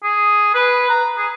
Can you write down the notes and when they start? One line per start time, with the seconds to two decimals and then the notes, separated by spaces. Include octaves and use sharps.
0.03 G#4
0.54 B4
0.90 A#5
1.18 G#4